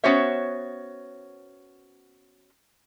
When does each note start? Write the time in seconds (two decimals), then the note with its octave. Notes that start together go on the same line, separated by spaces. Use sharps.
0.04 B3 C#4 F#4 C5 C#5 E5